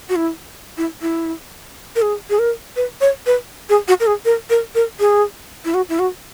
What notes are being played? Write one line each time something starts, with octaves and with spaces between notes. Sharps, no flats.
F#4
E4
E4
E4
A#4
G#4
G#4
A#4
B4
C#5
B4
G#4
F#4
A#4
G#4
A#4
A#4
A#4
G#4
E4
F#4
E4
F#4